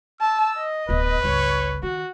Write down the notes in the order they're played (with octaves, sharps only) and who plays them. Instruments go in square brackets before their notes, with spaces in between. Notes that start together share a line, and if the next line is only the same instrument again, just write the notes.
[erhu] A5 [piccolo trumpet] E6
[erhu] D#5
[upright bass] D1 B3 [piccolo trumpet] B4
[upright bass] G1 C#2 [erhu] C#5
[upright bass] D#3 [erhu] F#4